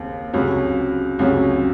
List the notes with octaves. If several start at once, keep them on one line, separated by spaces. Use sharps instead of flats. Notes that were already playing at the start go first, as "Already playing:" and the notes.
Already playing: D#2 C#3 C4
C#2 C3 F#3 C#4
C#2 C3 F#3 C#4